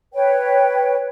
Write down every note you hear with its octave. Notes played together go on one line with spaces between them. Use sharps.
B4 C#5 G5